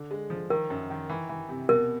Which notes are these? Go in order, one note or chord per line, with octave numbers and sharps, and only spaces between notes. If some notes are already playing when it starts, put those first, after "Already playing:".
Already playing: D3 D4
G#3
F3
D#3 A#4
F#2
D#3
E3
E3
C3
B2 A#4